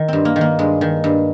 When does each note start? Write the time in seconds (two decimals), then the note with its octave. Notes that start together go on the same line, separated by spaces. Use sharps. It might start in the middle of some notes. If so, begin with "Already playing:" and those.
Already playing: D#3
0.08 G2 C4
0.25 A#3
0.36 D#3
0.41 A#3
0.59 G2 G#3
0.81 D#3
1.04 G2